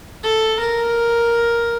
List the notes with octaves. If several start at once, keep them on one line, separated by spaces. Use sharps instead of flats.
A4
A#4